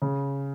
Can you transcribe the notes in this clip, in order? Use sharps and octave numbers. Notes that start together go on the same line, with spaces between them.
C#3